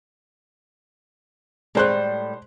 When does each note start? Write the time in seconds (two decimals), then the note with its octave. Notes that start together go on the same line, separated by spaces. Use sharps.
1.75 A2 D#3 G3 G#3 C5 F#6